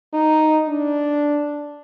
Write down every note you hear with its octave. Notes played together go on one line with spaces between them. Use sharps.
D#4
D4